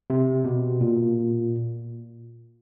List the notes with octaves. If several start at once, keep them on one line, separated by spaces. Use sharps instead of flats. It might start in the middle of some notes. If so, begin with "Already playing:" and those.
C3
B2
A#2